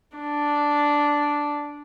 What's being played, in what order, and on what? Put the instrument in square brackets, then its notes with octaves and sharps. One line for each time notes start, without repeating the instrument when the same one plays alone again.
[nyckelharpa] D4